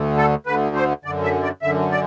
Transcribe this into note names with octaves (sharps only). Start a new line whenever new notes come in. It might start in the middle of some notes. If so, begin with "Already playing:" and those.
Already playing: D2 D3
A4
D2 D3 B4
C5
F#2 D3 D5
E5
D5
F#2 D3 E5
D5